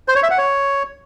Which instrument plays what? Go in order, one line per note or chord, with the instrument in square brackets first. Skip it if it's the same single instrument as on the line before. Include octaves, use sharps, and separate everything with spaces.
[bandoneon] C5
C#5
E5
F#5
C#5